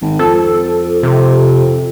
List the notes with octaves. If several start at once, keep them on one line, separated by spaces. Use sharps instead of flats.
G#1
F2 A4
C3